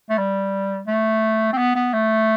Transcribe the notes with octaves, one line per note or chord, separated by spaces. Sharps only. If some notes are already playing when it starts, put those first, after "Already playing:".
A3
G3
A3
C4
B3
B3
A3